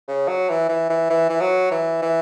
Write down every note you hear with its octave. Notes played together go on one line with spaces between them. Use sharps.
C#3
F#3
E3
E3
E3
E3
E3
F#3
E3
E3